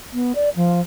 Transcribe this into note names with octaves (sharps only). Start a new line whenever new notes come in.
B3
D5
F3